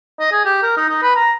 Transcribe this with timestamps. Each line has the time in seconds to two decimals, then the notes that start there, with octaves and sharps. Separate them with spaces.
0.20 D#5
0.32 G#4
0.45 G4
0.63 A#4
0.77 D#4
0.89 D#4
1.02 B4
1.16 A#5